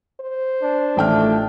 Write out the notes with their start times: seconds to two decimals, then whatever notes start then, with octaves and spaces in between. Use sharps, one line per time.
0.20 C5
0.63 D4
0.97 A1 D#3 F3 A3 G5 F6